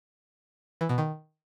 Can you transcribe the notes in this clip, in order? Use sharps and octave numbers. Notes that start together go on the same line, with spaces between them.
E3
B2
D#3